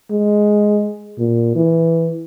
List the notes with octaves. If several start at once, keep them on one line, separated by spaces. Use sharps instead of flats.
G#3
A#2
E3